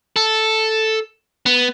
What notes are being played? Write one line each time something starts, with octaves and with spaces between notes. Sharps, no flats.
A4
B3